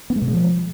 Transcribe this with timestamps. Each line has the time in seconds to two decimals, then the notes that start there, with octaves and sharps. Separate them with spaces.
0.10 B3
0.16 G#3
0.22 B2
0.28 G#3
0.34 F3